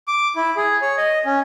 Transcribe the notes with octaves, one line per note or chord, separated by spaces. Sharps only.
D6
E4
G#4
C#5
D#5
C#4